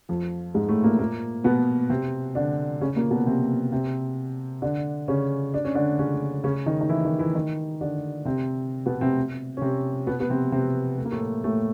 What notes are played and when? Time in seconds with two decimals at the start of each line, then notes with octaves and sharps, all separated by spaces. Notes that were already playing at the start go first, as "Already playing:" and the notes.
0.09 F2 F3
0.54 G#2 G#3
0.69 A2 A3
0.84 A#2 A#3
0.99 A#2 A#3
1.44 B2 B3
1.90 C3 C4
2.35 D3 D4
2.81 C#3 C#4
2.96 A#2 A#3
3.11 B2 B3
3.26 C3 C4
3.72 C3 C4
4.62 D3 D4
5.08 C#3 C#4
5.54 D4
5.64 C#4
5.75 D3 D4
5.99 C#3 C#4
6.44 C#3 C#4
6.66 D#3 D#4
6.81 D#4
6.89 E3 E4
7.05 D#3 D#4
7.19 E3 E4
7.35 D#3 D#4
7.81 D3 D4
8.25 C3 C4
8.86 B2 B3
9.01 C3 C4
9.57 C#4
9.61 C3 C4
10.07 B2 B3
10.20 B3
10.30 C3 C4
10.52 C3 C4
10.98 A3
11.05 A#3
11.12 A2 A3
11.44 A2 A3